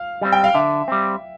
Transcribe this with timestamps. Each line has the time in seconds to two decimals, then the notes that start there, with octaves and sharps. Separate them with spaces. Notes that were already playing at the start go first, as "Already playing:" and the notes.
Already playing: F5
0.21 G3 C4
0.32 G5
0.44 F5
0.54 D3 E5
0.88 G3 C4